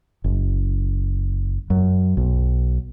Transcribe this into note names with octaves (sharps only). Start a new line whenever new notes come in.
F#1
F#2
B1